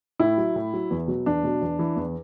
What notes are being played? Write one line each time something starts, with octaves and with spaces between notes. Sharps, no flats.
A2 E4
F#3
A2
F#3
E2
B2 F#3
E2 D4
B2 F#3
E2
E3
E2